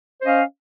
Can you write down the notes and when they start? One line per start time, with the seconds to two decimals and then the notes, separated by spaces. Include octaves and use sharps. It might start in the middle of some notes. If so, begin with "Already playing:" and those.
0.20 C5
0.23 C#4
0.25 D#5
0.28 F5